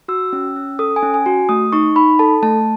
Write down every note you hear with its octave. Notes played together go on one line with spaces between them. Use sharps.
F#4 E6
C#4
C#4
A4 D#6
G#5
C#4
G#5
F#4
A3 D#6
D#4 C#6
D#4 B5
A4 A5
A3 A5